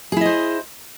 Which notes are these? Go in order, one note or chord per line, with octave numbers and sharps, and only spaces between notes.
E4 G#4 C5 D#5